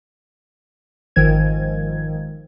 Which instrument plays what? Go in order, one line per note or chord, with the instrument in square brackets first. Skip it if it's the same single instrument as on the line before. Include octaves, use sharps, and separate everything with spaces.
[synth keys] G#1 D#3 F3 G#6